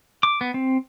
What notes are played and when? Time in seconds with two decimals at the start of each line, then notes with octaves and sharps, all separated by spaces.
0.23 D6
0.41 B3
0.54 C4